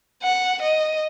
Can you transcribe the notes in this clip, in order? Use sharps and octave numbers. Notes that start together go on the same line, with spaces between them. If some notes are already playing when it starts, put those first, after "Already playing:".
F#5
D#5